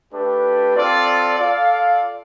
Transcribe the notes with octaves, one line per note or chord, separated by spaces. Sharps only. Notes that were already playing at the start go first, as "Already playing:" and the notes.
A3 D4 G4 B4
C4 F4 A4 D5
F4 A4 D5 F5